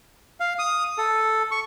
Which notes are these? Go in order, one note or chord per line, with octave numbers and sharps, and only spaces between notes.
F5
D#6
A4
C#6